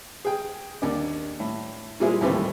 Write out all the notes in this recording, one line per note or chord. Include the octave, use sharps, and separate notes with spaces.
G#4 G5
D#2 D4
A2
A#2 G3 G#3 C4 E4 G#4
D#2 A2 E3 G3 A3 C4